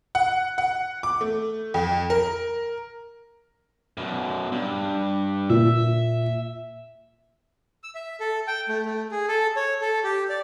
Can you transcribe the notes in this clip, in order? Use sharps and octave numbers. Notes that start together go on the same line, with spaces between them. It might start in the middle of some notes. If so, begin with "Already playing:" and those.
F#5
F#5
D6
A3
F2
A#4
F#2 B2
G2
A#2 E5
E6
E5
A4
G5
A3
A3
G#4
A4
C#5
A4
G4
D5